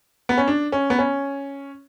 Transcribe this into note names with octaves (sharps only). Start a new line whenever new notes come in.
B3
C#4
D4
C#4
B3
C#4